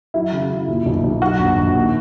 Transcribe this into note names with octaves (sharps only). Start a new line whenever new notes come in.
F#3 E4
C#3
C#3
A#2
B1
B1
F#3 F#4
A#1
A#1
D#2